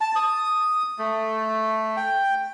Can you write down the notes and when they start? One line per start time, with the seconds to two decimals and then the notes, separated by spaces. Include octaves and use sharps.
0.01 A5
0.16 D#6
0.99 A3
1.97 G5